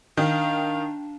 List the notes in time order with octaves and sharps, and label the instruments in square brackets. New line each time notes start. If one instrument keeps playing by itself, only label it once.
[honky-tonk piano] D#3 [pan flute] D4 [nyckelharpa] F5